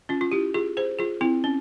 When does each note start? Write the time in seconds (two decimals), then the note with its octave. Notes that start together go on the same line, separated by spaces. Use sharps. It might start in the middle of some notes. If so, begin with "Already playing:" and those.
0.09 C#4 F4
0.21 F4
0.32 E4 G4
0.54 F4 G#4
0.77 G#4 C5
0.99 F4 G#4
1.21 C4 E4
1.44 C#4